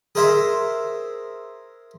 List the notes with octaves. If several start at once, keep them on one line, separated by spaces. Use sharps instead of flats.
G#4 A#4 C5 E5